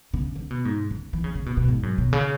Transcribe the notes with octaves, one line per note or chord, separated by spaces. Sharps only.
C#3
C#3
B2
G#2
C#3
E3
C#3
C#3
B2
B2
G#2
F#2
B2
C#3